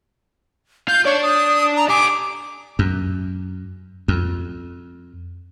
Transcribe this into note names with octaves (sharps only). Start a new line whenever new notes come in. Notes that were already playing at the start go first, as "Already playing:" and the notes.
F4 G6
D4 C#5 D5
D#6
A#5
G4 G#5 D6
F#2
F2